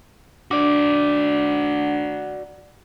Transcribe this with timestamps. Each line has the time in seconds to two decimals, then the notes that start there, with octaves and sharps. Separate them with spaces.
0.51 D4 F#4 D5